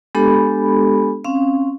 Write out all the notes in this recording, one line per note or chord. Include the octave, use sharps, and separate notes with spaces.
G#3 B3 D4 G4 A4 B5
C4 C#4 F5